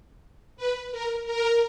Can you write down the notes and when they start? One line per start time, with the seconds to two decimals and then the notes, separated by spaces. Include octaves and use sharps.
0.57 B4
0.91 A#4
1.26 A#4